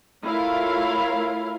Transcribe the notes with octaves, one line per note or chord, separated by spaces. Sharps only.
A3 E4 F4 A#4 C#5 F5